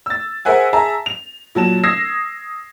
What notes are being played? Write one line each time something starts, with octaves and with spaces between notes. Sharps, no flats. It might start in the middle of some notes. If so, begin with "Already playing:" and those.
E6 A6
G#4 A#4 C5 E5 F#5 G#5
G#4 E5 A5 A#5
F7
A#2 F#3 A5 E7
D#6 E6 G#6 A#6 C7 E7